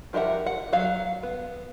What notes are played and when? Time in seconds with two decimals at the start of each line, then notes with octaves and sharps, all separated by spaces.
0.13 F3 G4 A#4 E5 F#5
0.46 F#5
0.73 F#3 F5
1.23 B3